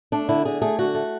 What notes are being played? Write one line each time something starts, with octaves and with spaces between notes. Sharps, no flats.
A3 D4
D3 E4
D3 G#4
A3 G#4
D3 F#4
A3